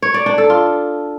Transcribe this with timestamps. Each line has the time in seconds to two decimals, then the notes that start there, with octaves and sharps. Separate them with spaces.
0.02 C#5
0.14 D5
0.26 D4
0.38 A4
0.50 F4